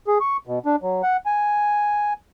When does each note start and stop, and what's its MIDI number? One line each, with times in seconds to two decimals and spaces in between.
0.07 0.18 68
0.21 0.37 85
0.47 0.59 47
0.65 0.76 62
0.82 1.02 54
1.03 1.17 78
1.26 2.13 80